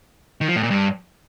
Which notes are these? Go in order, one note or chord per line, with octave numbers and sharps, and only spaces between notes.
D#3
F3
A2
A#2
G2